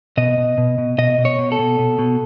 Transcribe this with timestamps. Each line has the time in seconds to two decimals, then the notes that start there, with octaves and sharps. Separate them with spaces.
0.17 B2 D#5
0.38 B2
0.58 B2
0.78 B2
0.98 B2 D#5
1.18 B2
1.25 C#5
1.38 B2
1.52 A4
1.59 B2
1.79 B2
1.99 B2